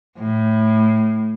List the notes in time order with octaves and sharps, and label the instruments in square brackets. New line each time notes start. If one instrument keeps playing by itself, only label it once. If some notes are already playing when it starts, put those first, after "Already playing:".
[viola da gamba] A2